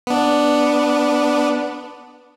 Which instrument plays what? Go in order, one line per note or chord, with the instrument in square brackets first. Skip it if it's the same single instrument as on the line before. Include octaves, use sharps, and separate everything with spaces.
[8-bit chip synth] B3 D4